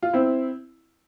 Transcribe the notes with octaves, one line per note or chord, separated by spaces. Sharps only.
F4
C4 E4